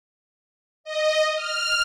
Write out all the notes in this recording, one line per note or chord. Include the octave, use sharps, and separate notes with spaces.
D#5
F6